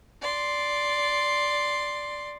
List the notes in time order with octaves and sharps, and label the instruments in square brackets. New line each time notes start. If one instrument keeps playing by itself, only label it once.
[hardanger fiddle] D5 C6